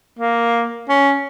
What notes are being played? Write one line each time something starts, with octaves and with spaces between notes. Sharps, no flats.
A#3
C#4